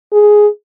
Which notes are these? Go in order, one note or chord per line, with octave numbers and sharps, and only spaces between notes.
G#4